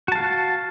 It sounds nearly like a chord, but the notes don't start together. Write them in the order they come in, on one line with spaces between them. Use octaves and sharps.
F#4 A5 F5